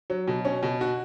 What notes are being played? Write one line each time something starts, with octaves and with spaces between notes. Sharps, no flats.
F#3
B2
C#4
B2
F#4